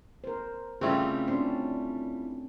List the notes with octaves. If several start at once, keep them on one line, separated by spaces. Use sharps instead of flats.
A#4 C5
C#3 G3 A3 C4 E4 F4 G4
C#4 D4 C5